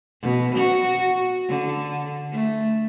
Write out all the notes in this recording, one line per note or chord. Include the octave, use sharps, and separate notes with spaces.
B2
F#4
D3
A3